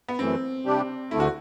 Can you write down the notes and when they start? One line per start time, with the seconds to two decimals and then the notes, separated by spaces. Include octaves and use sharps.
0.08 B3
0.19 F#2 E3 A3 C4
0.66 C3 G3 D4 G4
1.11 D2 D3 A3 E4
1.20 F#4